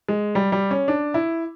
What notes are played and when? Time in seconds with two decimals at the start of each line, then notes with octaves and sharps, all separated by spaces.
0.09 G#3
0.35 G3
0.52 G3
0.71 C#4
0.88 D4
1.14 E4